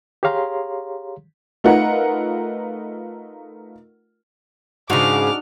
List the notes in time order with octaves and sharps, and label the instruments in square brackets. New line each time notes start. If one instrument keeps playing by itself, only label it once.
[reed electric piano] G4 G#4 C#5 F5 A#5 C6
[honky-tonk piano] A3 D#4 F4 A#4 B4 F#5
[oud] G#2 C#3 [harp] D4 D#4 F#4 [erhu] D6 [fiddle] F6